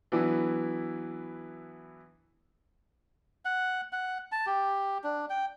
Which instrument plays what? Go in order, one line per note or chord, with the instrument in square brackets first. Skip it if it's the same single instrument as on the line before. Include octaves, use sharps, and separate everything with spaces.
[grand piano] E3 F#3 B3 D4 E4
[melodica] F#5
F#5
A5
G4
D4
G5